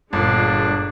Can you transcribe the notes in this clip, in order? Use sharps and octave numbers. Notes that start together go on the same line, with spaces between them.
G1 A#2 D3 G#3 D4